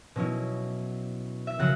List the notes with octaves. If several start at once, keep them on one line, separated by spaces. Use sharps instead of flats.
B2 F#3 C#4 E4
E5
C#3 F#3 F#5